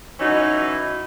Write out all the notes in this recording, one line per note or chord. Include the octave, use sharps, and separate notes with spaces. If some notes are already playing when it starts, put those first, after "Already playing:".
E3 F#3 C#4 D#4 F#4